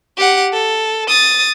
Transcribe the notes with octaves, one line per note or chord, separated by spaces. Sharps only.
G4 F#5
A4
D#6 A6